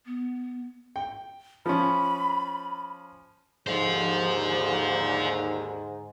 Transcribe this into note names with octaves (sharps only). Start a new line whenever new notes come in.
B3
G5
F3 C#4 B5
D#2 G#2 D3 C5 F5